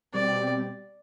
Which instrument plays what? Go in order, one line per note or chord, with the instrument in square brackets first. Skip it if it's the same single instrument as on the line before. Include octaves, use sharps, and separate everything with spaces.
[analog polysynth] B2 G3 C4 G4 [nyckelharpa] D5